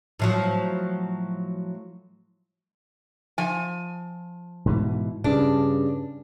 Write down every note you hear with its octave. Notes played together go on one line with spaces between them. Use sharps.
A2 F3 F#3
F3 G#5
G#2 B2 E3
G2 C#3 D4